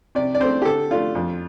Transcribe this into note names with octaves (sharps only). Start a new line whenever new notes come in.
C3 D5
D5
A3 C4 C5
G4
D3 A4
A3 D4 F4
F2